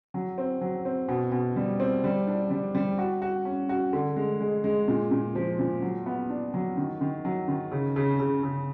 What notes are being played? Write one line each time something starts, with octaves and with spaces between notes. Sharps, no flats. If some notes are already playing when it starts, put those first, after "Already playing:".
F#3
C4
F#3
C4
B2
B2
G3
C4
G3
D4
G3
G3
F#4
F#4
C#4
F#4
D3
G#3
G#3
G#3
A#2
A#2
F3
A#2
F#3
B3
D4
F#3
D#3
D#3
F#3
D#3
C#3
C#3
C#3
C#3